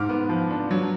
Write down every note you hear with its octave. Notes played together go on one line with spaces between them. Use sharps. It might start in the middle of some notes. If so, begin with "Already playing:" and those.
Already playing: G#2 D6 F6
B3
F3
D4
F#3